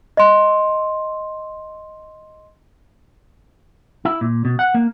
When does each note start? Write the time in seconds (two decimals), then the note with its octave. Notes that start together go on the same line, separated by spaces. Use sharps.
0.17 D#5 C6
4.05 E4
4.21 A#2
4.45 B2
4.59 F#5
4.74 A#3